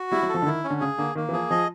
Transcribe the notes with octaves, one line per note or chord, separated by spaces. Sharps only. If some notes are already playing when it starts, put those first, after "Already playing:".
Already playing: F#4
G3 E4
F#3
A4
F3
D3
D#3 E4
C#4
D3
C#3 G#4
D3 A#3
D#3 A#3
E3
F3 G#4
F3 D#5